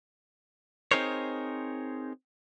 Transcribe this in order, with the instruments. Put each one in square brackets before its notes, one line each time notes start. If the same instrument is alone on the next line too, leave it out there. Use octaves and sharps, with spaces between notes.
[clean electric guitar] C4 D#4 G#4 A#4 C5 C#5